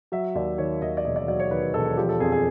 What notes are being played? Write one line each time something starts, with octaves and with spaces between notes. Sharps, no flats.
F#3 E5
D#2 D5
D#3 C#5
D#2 D#5
D5
E1 D#5
D5
F#3 D5
C#5
D#3 B4
E1 A4
F3 G4
A4
F2 G#4
G#4